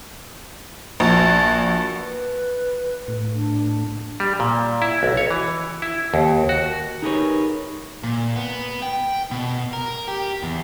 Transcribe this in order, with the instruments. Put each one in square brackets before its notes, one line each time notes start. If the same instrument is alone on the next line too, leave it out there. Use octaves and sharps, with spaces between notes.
[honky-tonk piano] A#1 [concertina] F#4 A5
[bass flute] B4
[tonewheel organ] A2
[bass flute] D4
[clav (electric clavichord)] G3
A#2
E4
B1
C#5
E3
E4
D#2
F#4
[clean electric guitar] D#4 G4 G#4 A#4 B4 C#5
[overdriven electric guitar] A#2
B3
G5
B2
A#4
G4
E2